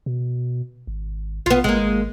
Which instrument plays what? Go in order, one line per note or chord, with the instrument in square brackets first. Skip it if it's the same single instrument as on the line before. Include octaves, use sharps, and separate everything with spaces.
[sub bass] B2
G#1
[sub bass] A#1 [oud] B3 F4
[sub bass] G#1 [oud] G#3 A#3